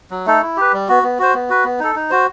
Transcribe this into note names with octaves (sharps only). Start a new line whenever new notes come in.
F#3
A3 D#4 A4
E4
G4 B4
G3
B3 F#4
B3
F#4 C5
B3
F#4 B4
B3
D#4 A4
D#4
F#4 C5